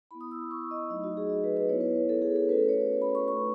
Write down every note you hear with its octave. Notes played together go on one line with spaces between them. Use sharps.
B3 E4 B5
D#6
E6
C#6
D#5
F#3 A3 D#4 D#5
F#4
G#4
D#5
B4
B4
B3 E4 C#5
B4
A4
G#4
A4
A3 C#4 F#4 B4
C#5
B5
C#6
A3 D#4 F#4 C#6